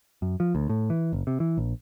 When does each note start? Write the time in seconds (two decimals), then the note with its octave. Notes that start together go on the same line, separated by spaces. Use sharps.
0.22 F#2
0.40 F3
0.55 D2
0.69 A2
0.90 E3
1.13 F#1
1.27 C3
1.40 E3
1.58 A#1